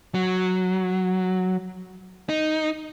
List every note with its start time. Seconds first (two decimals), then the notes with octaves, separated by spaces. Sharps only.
0.15 F#3
2.29 D#4